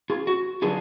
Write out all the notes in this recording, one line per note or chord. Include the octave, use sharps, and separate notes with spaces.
F4 G#4
F#4
D3 F#3 B3 D4 F4 G#4